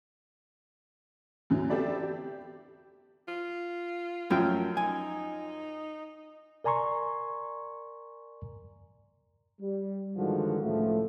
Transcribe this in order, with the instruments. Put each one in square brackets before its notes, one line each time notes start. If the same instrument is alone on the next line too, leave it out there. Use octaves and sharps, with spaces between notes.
[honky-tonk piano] E2 D3 E3 F#3
B3 C4 G4 A4 D5 E5
G4
[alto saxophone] F4
[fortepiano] F#2 F3 G5 [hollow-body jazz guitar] A3 C#4
[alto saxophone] D#4 [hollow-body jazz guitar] G#5
[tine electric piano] A#4 D5 G#5 A#5 C6 C#6
[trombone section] G3
G2 D3 D#3 F3 G#3 F#4
C#2 A2 E3 F3 A3